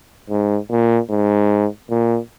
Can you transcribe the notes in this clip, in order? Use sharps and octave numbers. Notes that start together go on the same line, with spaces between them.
G#2
A#2
G#2
A#2